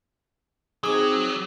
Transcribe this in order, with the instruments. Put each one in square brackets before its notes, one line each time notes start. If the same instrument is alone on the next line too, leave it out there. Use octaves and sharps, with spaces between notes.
[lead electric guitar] F#3 [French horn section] C4 D#4 [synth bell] G#4 D6 [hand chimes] D#6